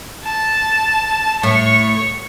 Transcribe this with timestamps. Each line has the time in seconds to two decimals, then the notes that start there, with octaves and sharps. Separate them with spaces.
0.24 A5
1.43 A2 C#5 C#6